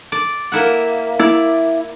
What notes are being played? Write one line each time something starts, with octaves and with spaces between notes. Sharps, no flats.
D5
A#3 E4 F#5
E4 D5